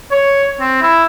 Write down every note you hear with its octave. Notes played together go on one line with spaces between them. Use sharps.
C#5
C4
E4